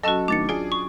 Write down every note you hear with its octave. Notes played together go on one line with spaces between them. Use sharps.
F#3 C#4 F#4 A4 D#5 A5
A2 D#3 D4 D6 A6 C#7
D4 F4 G#4 D7
C#6